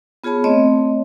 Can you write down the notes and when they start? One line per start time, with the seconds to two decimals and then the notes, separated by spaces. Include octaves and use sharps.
0.24 B3 F4 G#4 C#5 A5 B5
0.44 A3 C4 C#5 D#5